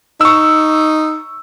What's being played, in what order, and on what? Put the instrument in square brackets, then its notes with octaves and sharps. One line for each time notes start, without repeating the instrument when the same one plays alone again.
[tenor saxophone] D#4 [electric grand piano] C#6 E6